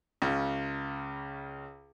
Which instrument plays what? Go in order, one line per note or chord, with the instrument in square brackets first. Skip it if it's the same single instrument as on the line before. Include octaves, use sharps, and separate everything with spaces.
[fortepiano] C#2 C#3